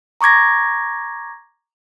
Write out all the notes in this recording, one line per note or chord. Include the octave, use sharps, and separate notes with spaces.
A#5 C#6 D6 G#6 A#6